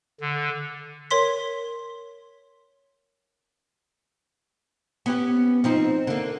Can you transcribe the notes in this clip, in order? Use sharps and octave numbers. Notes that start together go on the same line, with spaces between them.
D3
A#4 C#5 C6 B6
B3 C#4 G4
F3 C4 D#4
D3 A#3